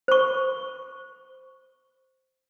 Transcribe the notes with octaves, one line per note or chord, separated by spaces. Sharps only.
C5 C#6